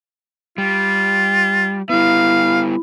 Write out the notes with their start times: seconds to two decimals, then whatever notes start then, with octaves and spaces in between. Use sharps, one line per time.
0.58 G3 F4
1.89 G3 B3 E4 F5